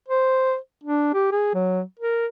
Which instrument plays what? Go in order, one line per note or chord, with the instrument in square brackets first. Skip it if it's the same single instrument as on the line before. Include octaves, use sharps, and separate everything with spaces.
[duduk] C5
D4
G4
G#4
F#3
A#4